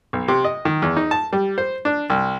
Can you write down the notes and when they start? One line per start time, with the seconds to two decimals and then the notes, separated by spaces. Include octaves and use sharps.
0.13 B1
0.28 C3
0.44 D#5
0.65 D#3
0.82 E2
0.97 D#4
1.11 A5
1.33 G3
1.58 C5
1.85 D4
2.10 C2